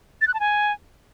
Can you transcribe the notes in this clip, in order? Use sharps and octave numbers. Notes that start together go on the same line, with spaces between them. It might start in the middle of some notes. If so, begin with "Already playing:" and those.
A6
F#6
A5
G#5